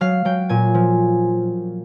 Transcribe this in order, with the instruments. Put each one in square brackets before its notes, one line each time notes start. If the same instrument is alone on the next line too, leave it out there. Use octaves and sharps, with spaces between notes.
[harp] F#3 F5
F#3 G5
A#2 G#5
F3